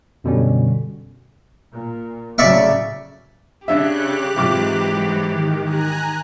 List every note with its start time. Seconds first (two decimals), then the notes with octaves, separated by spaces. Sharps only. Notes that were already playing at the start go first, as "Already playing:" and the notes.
0.24 F#2 B2 D3 G3 C#4
1.70 A#2
2.38 A2 C#3 F#3 D5 E5 C#6
3.68 C#3 D4 G4 E5 F#6
4.36 G#2 C3 E3 F#3 F4 D6
5.30 D#3
5.64 G#5 A#5 F#6